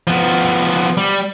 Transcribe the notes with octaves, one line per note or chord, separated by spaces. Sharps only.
F3 B3
G3